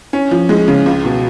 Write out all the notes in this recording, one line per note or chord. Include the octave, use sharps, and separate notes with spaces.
C#4
F3
G#3
C#3
C#2
B2